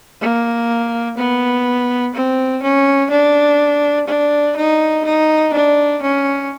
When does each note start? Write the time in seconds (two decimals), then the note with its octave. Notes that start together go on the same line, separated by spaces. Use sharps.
0.20 A#3
1.17 B3
2.14 C4
2.62 C#4
3.11 D4
4.07 D4
4.56 D#4
5.05 D#4
5.53 D4
6.02 C#4